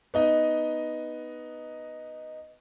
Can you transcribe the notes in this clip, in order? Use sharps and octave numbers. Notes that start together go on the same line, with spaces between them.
B3 D#4 D#5